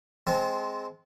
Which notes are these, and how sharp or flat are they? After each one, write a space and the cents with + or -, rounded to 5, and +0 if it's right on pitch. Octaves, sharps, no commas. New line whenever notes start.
G#3 +0 C4 +0 A4 -35